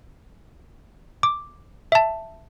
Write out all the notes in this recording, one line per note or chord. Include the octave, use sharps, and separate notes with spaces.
D6
E5 A5